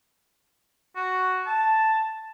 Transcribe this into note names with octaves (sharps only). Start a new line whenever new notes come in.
F#4
A5